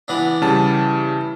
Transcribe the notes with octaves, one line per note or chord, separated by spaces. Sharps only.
E3 B3 D4
C#3 G3 A5